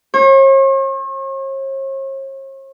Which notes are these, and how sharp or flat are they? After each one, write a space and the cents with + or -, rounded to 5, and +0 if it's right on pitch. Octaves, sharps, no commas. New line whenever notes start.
C#5 -45